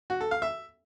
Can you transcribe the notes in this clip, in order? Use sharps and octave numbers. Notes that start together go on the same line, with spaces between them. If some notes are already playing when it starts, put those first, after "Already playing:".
F#4
A4
F5
E5